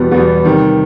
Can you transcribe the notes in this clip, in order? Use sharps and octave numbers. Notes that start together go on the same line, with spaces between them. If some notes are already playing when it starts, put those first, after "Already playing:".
Already playing: E2 B2 G3 B3
E2 B2 G3 B3
C3 D#3 G3